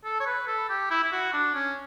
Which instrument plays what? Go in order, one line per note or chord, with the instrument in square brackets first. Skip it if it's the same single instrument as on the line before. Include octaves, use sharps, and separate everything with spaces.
[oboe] A4
C#5
B4
A4
G4
E4
E4
F#4
D4
C#4